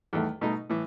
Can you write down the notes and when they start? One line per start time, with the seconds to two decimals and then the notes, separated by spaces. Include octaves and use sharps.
0.13 E2 D#3 A3
0.41 B2 A3 D#4
0.70 A2 E3